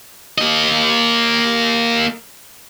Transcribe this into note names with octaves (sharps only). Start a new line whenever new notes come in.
A#3 D#5